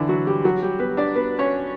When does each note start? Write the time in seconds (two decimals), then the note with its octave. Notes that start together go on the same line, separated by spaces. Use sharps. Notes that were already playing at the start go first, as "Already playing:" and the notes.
Already playing: D3 E3 D4 E4
0.09 F#3 F#4
0.27 G3 G4
0.44 F#3 F#4
0.62 G3 G4
0.80 B3 B4
0.97 D4 D5
1.16 B3 B4
1.39 C#4 C#5